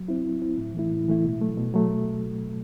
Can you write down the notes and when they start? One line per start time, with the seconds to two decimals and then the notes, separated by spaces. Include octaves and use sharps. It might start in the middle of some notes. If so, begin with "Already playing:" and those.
Already playing: F#3
0.08 C4 E4
0.25 F#3
0.42 C4 E4
0.58 A2
0.74 E3 A3 E4
0.92 A2
1.08 E3 A3 E4
1.24 B2
1.40 F#3 A3
1.57 B2
1.74 F#3 A3